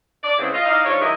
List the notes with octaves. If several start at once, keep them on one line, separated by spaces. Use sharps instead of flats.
D5
C#3 G#3 A3 B3 C4 E4
F4 D#5
D#4 E4 D5 D#5 F5
G#2 D4 F4 C#5
D#3 F#3 E4 G4 B4 D#5